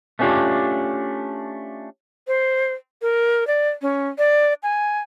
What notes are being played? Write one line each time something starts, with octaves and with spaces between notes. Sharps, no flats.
A3 B3 C#4 D4 F4 G4
C5
A#4
D5
C#4
D5
G#5